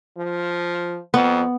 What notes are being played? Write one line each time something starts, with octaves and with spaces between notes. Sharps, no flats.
F3
F2 B3